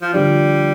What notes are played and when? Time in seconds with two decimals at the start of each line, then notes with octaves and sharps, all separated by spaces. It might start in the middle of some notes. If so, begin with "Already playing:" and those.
0.02 F3
0.13 D3 F3 G3